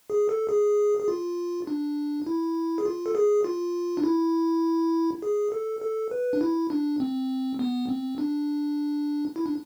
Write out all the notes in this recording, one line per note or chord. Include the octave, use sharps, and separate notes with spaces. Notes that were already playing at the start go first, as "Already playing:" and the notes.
G#4
A4
G#4
G#4
F4
D4
E4
G#4
F4
A4
G#4
F4
D4
E4
G#4
A4
A4
B4
D4
E4
D4
C4
B3
C4
D4
E4
D4